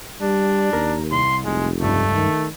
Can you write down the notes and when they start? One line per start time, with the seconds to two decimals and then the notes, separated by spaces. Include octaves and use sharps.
0.22 G3 D4
0.73 D#2 A#4
1.12 C2 C6
1.45 F1 G#3
1.81 C#2 G2 A3
2.15 D#3